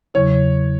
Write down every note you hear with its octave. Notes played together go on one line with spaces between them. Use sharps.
E2 C#3 F#3 E4 C#5